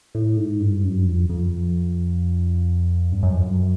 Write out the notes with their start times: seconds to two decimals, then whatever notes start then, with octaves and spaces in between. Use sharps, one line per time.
0.15 A2
0.37 G#2
0.60 G2
0.84 F#2
1.06 F2
1.29 F2
3.12 G2
3.23 F#2
3.33 F2
3.43 F#2